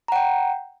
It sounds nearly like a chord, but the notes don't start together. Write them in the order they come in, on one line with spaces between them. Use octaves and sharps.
A#5 F#5 G5